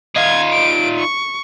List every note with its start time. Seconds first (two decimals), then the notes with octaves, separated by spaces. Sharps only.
0.16 D#4 F4 G#6
0.52 D7
0.99 C#6